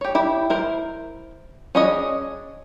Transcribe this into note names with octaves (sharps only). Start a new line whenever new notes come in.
G4 C#5
E4 G4 B5
E4 A#4 C5
C#4 D4 G#4 C#5 D#5